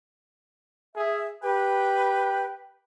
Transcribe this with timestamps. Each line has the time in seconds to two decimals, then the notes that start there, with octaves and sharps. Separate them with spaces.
0.96 G#4 E5
1.43 G4 B4 G5